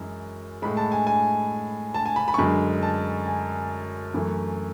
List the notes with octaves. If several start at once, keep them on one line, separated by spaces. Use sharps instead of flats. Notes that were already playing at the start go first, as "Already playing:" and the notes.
Already playing: F#2 E3 G#3
A2 G#3 B5
A5
G#5
G#5
A5
G#5
B5
B5
C#6
F#2 D3 G#3 B5
A5
G#5
F#2 E3 A3